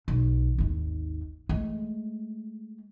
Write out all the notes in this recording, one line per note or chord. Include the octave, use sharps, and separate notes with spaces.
B1
G#1 D#2
G#3 A3